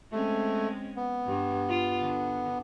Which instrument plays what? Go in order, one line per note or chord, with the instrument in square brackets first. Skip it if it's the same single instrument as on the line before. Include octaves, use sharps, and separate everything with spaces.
[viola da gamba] G#3 C4 C#4 [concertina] A3
[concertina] B3
[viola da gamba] G2
F4
D3